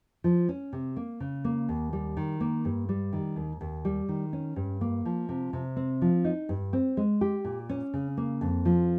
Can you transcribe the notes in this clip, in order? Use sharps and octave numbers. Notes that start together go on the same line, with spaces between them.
F3
C#4
C3
A#3
C#3
A#3
D#2
G3
D#3
A#3
G2
G3
D#3
D#2
D#2
G3
D#3
C#4
G2
A#3
F3
C3
C3
C4
F3
D#4
G2
C4
G#3
G4
A#2
C#4
C#3
A#3
F2
F3